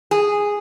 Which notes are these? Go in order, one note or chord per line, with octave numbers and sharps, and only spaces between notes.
G#4